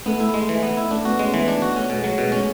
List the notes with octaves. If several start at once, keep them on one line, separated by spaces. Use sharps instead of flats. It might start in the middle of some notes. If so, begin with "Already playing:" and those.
A3 B3
E4
G#3
E3
B3
E4
A3 D4
B3 F#4
G#3 C#4
E3 B3
D4
F#4
A3 C#4
B2
G#3
F#3
B2 G#3
A3 C#4